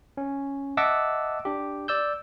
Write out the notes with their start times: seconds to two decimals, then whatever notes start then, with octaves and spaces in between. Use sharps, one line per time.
0.17 C#4
0.77 D#5 E5 F#5 A5 D6 E6
1.45 D4 G4
1.88 D5 E6 G6